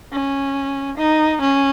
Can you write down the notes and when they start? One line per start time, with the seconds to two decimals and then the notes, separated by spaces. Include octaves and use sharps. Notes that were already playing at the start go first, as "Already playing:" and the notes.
0.13 C#4
0.97 D#4
1.41 C#4